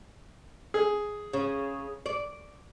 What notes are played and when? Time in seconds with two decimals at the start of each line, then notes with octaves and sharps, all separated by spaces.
0.74 G#4
1.33 C#3
2.06 D5